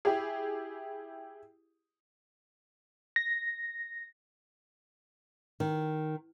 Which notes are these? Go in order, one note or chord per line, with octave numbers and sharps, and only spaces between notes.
E4 G4 G#4
A#6
D#3